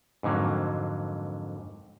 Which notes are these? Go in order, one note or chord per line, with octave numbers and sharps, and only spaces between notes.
F2 G#2 D3 F#3 A#3